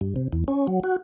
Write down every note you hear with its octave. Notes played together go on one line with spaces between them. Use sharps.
G2
C3
E2
C#4
F#3
F#4